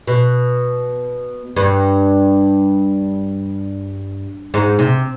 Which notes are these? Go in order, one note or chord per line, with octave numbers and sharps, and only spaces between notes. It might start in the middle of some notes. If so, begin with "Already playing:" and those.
B2
G2
G#2
C3